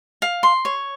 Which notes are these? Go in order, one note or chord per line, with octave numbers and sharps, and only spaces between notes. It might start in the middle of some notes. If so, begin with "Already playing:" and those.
F5
C6
C#5